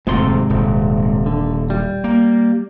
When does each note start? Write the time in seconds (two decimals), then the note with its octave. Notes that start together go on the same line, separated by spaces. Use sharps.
0.07 D#1 F2 G#2 C3 A3 C6
0.50 D#1
1.26 D3
1.70 G3
2.04 A#3